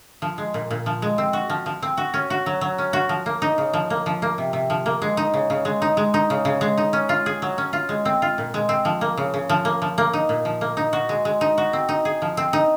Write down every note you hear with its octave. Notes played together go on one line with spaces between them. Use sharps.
F3
G#3
A#2
A#2
F3
G#3
C4
F#4
F3
F3
C4
F#4
C#4
F#4
F#3
F#3
C#4
F#4
F3
A#3
D#4
C#3
F3
A#3
F3
A#3
C3
C3
F3
A#3
G#3
D#4
C#3
C#3
G#3
D#4
G#3
D#4
C#3
C#3
G#3
D#4
C#4
F4
G#4
F#3
C#4
F4
G#3
C4
F4
A#2
G#3
C4
F3
A#3
C#3
C#3
F3
A#3
F3
A#3
D#4
A#2
F3
A#3
D#4
F#4
G#3
G#3
D#4
F#4
C4
D#4
G#4
F3
C4
D#4